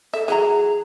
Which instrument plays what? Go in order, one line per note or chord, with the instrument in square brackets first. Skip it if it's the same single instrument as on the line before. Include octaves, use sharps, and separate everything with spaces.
[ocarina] A4 [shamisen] E5
[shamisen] E3 F#3 A#5 [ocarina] G#4